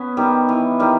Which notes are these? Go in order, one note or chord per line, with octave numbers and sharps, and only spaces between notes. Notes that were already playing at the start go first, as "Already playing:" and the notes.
Already playing: B3 C#4
D#3 G3
E3
D#3 G3